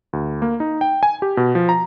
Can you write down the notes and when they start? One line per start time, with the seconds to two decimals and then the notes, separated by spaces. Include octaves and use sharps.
0.13 D2
0.42 A#3
0.60 D#4
0.81 G5
1.03 G#5
1.22 G4
1.37 B2
1.55 F3
1.69 A#5